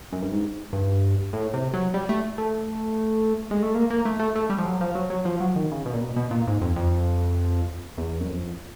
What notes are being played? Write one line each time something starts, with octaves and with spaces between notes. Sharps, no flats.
F#2
G2
G#2
G2
A2
C3
F#3
G3
A3
A3
G#3
A3
A#3
A#3
A3
A3
A3
G3
F3
F#3
F3
F#3
F#3
F3
F#3
D#3
C#3
B2
A#2
B2
B2
A#2
G#2
F2
F2
E2
F#2
F2